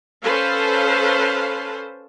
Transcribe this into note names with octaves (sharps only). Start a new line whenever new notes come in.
C#4 A4 B4 C5 F5 A5